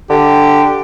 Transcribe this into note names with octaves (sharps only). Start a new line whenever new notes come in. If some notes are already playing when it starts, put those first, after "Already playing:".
D3 G4